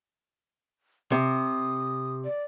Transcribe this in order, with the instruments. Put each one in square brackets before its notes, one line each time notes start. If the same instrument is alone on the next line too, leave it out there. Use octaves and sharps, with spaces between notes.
[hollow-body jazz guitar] C3 [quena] D#6
[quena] D5